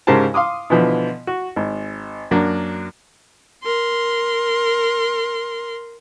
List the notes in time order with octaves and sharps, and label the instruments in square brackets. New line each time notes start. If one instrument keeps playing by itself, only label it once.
[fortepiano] G#2 C#3 G4 A#4 C5 A5
F5 C6 D6 D#6
B2 D3 E3 F3
F#4
G#1
F#2 F#3 A#3 D4
[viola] A#4 C6